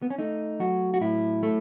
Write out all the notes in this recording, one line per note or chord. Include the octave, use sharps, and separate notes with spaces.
B3
C#4
A3 D#4
F#3 F#4
F#4
A2 E4
A3